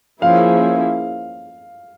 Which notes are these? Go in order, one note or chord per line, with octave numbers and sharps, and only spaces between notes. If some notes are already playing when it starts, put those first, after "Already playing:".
F3 A#3 C#4 E4 G#4 F5